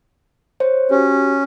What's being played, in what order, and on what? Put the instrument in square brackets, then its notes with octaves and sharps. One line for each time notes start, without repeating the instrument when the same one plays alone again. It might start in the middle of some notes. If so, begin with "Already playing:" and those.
[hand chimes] C5 C#5
[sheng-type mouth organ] C#4 [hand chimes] F#4 G4